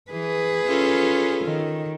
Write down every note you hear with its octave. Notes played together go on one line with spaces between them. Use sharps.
E3 G#4 B4
C#4 F4 A4
D#3